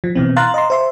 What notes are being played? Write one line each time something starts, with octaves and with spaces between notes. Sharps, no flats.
F3
B2 E3 C4
F5 A#5 C6 F#6 A6
D#5 A#5 C6
C5 E5 C6